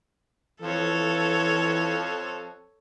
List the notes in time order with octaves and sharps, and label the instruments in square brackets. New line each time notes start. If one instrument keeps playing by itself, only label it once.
[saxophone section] F2 F3 [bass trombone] E3 [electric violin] A4 C#5